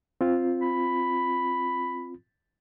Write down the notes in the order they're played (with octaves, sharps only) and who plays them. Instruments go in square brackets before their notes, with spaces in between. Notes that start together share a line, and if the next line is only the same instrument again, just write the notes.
[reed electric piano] C4 F4
[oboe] B5